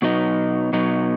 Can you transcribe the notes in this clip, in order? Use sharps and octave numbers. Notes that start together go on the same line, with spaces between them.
B2 F#3 B3 D#4
B2 F#3 B3 D#4